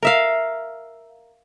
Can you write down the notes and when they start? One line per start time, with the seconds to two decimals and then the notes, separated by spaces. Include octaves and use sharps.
0.03 A#4 E5 F5